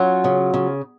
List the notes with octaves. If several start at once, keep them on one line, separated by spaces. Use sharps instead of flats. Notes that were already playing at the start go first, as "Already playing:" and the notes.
Already playing: F#3 C#4 F4
C#3
C#3